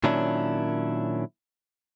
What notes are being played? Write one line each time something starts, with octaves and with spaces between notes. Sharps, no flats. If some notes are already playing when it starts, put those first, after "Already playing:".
A#2 D#3 F#3 C#4 D4 E4